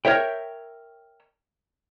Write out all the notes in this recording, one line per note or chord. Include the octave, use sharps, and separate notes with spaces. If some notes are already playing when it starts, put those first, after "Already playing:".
A#4 C#5 E5 G5